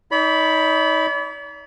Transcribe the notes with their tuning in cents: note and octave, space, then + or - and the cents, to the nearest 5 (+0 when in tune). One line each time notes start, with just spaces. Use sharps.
D#4 +25 D5 -45 B5 +0